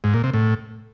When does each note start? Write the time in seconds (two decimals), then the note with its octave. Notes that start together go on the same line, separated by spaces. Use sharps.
0.04 G#2
0.14 A#2
0.24 C3
0.34 A2